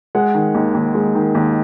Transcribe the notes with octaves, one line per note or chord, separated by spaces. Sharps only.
G#3 F#5
D#3
D#2
D#2
G#3
D#3
D#2